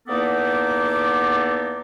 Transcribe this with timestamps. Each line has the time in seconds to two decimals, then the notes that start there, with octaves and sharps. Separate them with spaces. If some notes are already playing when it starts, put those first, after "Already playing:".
0.08 E2 A#3 B3 D#4 A4 D6